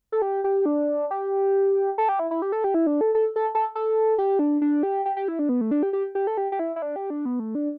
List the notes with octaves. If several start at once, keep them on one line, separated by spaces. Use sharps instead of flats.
A4
G4
G4
D4
G4
A4
G4
E4
E4
G4
A4
G4
E4
D4
A4
A4
A4
A4
A4
G4
D4
D4
G4
G4
G4
E4
D4
B3
A3
D4
G4
G4
G4
A4
G4
G4
E4
E4
D4
G4
D4
B3
A3
D4